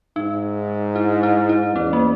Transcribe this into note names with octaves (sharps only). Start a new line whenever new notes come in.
G#2 D#4
E4
E4
E4
E2 C#4
A#3